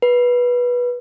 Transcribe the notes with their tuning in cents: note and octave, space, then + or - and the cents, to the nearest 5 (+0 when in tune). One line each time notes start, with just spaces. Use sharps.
B4 -15